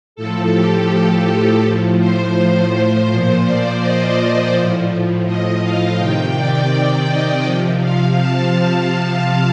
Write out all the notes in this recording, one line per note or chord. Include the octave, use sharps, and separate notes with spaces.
A2 F3 A4
G4
A2 F3
C5
A#2 F3 C5
D5
D#5
D#5
A2 F3
D#5
F5
C3 D#3 G5
D5
D#5
C3 F3
F5
A5